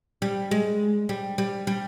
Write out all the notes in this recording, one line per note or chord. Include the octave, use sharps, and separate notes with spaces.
G3
G#3
G3
G3
G3